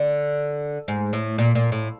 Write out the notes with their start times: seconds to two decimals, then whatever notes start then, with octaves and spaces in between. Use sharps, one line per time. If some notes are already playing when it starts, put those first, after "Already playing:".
Already playing: D3
0.88 G#2
1.13 A2
1.38 A#2
1.55 A#2
1.72 A2